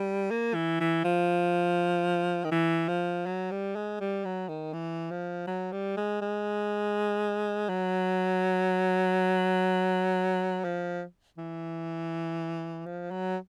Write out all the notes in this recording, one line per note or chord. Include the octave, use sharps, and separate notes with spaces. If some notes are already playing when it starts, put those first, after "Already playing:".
Already playing: G3
A#3
E3
E3
F3
D#3
E3
F3
F#3
G3
G#3
G3
F#3
D#3
E3
F3
F#3
G3
G#3
G#3
F#3
F3
E3
F3
F#3